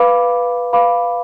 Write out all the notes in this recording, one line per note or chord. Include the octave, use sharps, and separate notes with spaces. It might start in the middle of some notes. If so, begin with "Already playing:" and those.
Already playing: B4 F5 B5 D6
B4 F5 B5 D6